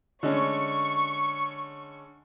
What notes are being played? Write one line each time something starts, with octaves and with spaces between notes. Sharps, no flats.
D3 G#3 C#4 C#6